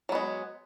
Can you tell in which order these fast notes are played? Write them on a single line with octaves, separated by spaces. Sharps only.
F#3 B3 G#3